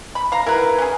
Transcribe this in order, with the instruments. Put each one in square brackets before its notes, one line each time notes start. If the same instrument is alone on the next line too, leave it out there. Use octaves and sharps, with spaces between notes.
[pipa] B5
F5 A#5
[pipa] E4 F#5 [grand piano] A#4 B4
[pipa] C#4 G#4